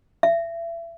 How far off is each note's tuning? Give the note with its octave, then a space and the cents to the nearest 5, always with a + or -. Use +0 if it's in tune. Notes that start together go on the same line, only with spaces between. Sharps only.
E5 +30